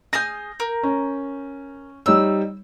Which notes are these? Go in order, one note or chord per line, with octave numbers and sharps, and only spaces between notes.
G#4 D#6 F6 G6 A#6
A#4
C#4
G3 D#4 C#5 E6